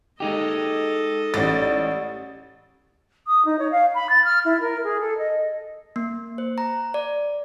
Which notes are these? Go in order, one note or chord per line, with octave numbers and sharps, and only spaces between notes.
G#3 D#4 G4 A4 D#5
A1 G3 A6
D#6
D#4
C#5
F5
B5
A6
F6
E4
A#4
G#4
A4
D#5
A#3
C5
A#5
D5